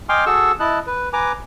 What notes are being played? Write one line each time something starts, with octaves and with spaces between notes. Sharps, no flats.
D#5 G5 G#5 C6 D6 F6
F#4 G#4 A4 C#6 E6
E4 D#5 A5 F#6
B4
B4 G#5 A#5 D6